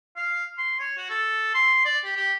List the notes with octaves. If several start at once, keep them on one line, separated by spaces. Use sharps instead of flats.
F5
C6
C#5
F#4
A4
C6
D5
G4
G4